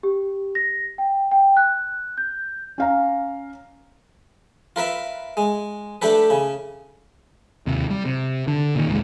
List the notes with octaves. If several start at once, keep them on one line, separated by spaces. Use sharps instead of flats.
G4
A#6
G5
G5
F#6
G6
C#4 F5 A#5
F4 A#4 B4 E5
G#3
A3 D4 G4 A4 B4
C#3
D#2 C3
G3
C3
D3
A#2 D#3
F1 A#1 C3 G#3